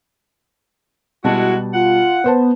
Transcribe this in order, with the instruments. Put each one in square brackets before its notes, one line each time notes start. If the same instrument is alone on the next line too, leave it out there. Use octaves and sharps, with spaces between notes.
[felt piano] B2 G3 A5 [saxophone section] G#3 E4 F#4
[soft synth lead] F4 [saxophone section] F#5
[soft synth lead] B3 [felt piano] B4 C5 A5